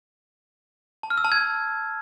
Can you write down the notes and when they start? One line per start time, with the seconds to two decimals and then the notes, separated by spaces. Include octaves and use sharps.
1.03 A5
1.10 F6
1.17 E6
1.25 A5
1.32 G#6